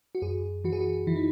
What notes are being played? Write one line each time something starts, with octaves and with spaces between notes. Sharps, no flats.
F#4
F#2 G#4
E3 F#4
G#4
F#4
E3 E4
D#4